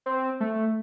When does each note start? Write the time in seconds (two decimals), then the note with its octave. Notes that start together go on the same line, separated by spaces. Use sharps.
0.06 C4
0.40 A3